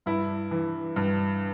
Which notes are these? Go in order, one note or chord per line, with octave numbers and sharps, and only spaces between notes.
G2 E4
E3
G2